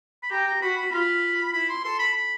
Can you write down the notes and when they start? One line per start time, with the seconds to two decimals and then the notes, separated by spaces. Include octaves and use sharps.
0.23 B5
0.31 G4 A#5
0.47 A#5
0.62 F#4 B5
0.78 B5
0.92 F4 B5
1.53 E4 B5
1.69 C6
1.84 A4 C6
1.99 B5
2.14 B5